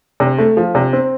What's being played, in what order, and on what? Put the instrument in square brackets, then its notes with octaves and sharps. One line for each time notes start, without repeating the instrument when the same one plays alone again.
[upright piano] C3
A3
F3
C3
C4